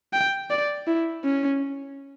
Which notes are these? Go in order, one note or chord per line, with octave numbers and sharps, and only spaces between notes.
G5
D5
E4
C#4